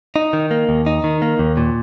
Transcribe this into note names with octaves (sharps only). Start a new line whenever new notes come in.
D#4
D#3
A#3
D#2
D#4
D#3
A#3
D#2
A#2